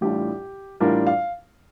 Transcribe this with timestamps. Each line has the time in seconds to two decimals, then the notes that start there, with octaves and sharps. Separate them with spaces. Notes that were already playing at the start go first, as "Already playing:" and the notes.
0.01 A1 A2 G3 D4 F4 G4
0.80 A1 A2 G3 D4 F4 A#4
1.07 F5